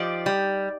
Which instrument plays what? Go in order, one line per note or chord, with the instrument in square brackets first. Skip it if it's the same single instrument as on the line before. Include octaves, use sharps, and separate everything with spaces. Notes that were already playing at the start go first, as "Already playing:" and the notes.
Already playing: [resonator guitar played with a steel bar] F3 [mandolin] D#4 G4 D5
[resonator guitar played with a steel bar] G3